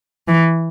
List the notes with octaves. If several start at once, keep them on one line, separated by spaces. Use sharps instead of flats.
E3